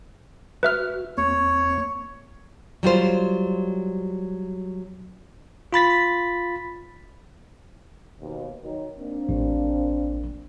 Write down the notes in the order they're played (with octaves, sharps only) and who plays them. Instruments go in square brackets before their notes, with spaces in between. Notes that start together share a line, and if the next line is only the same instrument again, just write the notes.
[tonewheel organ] F#4 [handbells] B4 E5 F6
[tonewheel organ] E2 A#3 C4 [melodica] C#5
[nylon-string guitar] F#3 G3 F4 C5
[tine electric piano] F4 B5 A6 B6
[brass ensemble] D#2 B2
D#3 F#3
A#3 C4 D4
[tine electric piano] A1